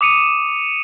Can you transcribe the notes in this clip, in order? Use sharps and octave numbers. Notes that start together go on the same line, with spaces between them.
D6 D#6 C#7 D#7